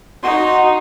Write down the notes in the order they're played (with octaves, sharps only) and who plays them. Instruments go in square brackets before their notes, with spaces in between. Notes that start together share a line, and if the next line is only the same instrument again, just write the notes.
[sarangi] D#4 [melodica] F#4 C6